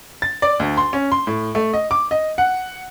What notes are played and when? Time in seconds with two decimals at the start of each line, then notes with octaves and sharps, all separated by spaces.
0.22 A6
0.42 D5
0.60 D2
0.77 C6
0.93 C#4
1.12 C6
1.27 A2
1.55 A3
1.73 D#5
1.91 D6
2.11 D#5
2.38 F#5